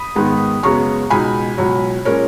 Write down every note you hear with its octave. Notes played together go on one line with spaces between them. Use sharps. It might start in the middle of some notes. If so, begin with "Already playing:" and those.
Already playing: B5 D#6
G#2 D#3 G#3 B3 D#4
F#2 C#3 G#3 B3 A#5 C#6
C#2 B2 G#3 D#4 G#5 B5
C#2 B2 F#3
A#2 G#3 C#4 A#4 C#5